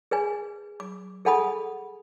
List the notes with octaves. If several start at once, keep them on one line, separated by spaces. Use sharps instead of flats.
G#4 B4 G#5
D6
G#4 A4 F#5 G#5 B5 D#6